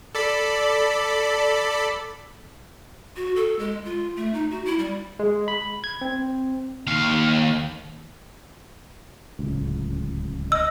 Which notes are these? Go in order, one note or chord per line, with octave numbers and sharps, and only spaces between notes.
A4 D5 B5
F#4
A4
G#3
F4
A3
D#4
F#4
E4
G3
G#3
B5
G#6
C4
D#2 F5
D1 C#2
D#5 E6